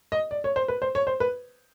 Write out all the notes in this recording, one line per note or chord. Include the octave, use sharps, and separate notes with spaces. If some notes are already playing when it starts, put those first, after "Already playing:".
D#5
D5
C#5
C5
B4
C5
C#5
C5
B4